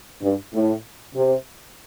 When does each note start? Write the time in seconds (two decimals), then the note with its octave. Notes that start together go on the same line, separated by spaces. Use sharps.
0.22 G2
0.54 A2
1.15 C3